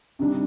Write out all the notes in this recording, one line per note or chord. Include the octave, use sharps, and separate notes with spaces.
C3 D#3 G3 D4